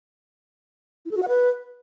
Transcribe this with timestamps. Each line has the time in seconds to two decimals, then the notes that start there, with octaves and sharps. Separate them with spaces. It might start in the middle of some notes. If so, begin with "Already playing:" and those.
1.05 E4
1.11 A4
1.17 F#4
1.23 F#5
1.28 B4